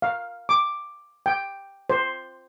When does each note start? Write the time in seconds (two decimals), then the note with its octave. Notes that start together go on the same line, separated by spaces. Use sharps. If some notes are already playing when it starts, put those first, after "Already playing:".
0.02 F5
0.49 D6
1.26 G5
1.90 C5